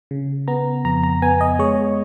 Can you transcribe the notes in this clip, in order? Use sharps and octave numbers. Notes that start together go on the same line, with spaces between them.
C#3
B3 A#5
F2 A#5
A#5
B3 G#5
D#5
G#3 C#5